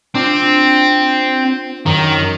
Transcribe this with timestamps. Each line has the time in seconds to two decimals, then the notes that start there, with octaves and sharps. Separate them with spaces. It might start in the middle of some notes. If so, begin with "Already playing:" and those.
0.15 C4 D4 F4
1.86 F#2 D#3